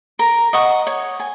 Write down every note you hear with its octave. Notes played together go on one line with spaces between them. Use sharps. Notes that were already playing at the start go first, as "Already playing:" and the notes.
A#4
D#5 F#5 C#6
C#5
G#5